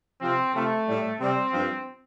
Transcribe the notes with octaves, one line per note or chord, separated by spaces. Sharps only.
C3 F3 C4
C3 F3 A3
A2 G3
C3 G3 C4
G2 F3